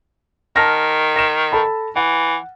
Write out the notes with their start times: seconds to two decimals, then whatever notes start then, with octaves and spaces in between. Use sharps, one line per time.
0.56 D#3 A5 F6 A#6
1.16 A#6 E7
1.52 A4 A5 B5
1.96 E3 F#5